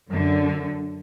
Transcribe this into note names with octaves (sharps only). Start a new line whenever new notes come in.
F#2 D3